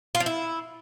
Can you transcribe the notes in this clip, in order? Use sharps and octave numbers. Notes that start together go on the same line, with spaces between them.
F4
F3
E4